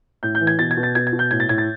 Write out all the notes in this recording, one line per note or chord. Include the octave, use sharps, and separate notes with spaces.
A2 G6
G6
E3
G#6
B2 A6
G#6
B2
A6
B2 G#6
G#6
B2
G6
A2 G#6
A6
A2 G#6
A6